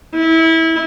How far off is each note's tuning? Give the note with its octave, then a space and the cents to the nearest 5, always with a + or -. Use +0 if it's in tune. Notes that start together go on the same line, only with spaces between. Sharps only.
E4 -20